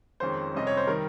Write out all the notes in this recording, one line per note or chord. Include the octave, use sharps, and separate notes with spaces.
F2 D#3 G#3 C#4 C5
F2 C3 G3 C#4 D#5
C#5
C5
D#3 G3 A#4